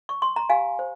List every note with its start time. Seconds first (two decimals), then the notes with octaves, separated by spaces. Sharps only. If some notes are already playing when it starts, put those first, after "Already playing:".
0.09 C#6
0.22 C6
0.36 A#5
0.49 G4 F5 G#5
0.79 C5